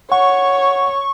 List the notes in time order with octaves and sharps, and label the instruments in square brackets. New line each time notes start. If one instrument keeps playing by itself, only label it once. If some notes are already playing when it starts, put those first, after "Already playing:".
[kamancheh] C#5 [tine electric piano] F#5 [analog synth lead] C#6